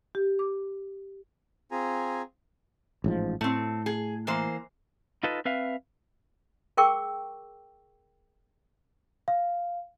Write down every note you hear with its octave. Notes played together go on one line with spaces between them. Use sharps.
G4
D6
C4 F4 G#4 G#5 A#5
A1 G#2 F3
A2 A3 C4
G#4
E3 A#3 C5
D#4 F4 A4 B4 D#5
C4 B4 E5 F5
G#4 A#4 G5 C#6 D6 E6
F5